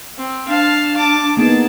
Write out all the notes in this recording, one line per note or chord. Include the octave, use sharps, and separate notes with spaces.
C4
D4 F5 A5
A5 D6
A#3 B3 D#4 G#4 A5